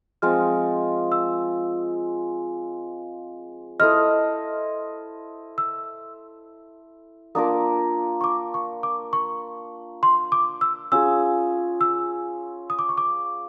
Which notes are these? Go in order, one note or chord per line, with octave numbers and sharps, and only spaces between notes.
F3 G#3 C4 F4 F6
E6
E4 A4 C5 D#5 F6
E6
A#3 D4 F4 A#4 D#6
C#6
D6
C#6
D6
C#6
C6
D6
E6
C#4 F4 G#4 E6
E6
D#6
D6
C#6
D6